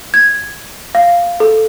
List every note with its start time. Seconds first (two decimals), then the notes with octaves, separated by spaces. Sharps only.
0.14 G#6
0.95 F5
1.40 A4